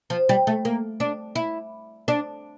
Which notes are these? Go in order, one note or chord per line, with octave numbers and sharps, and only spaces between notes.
F3
G3
A3
A#3
D4
E4
D4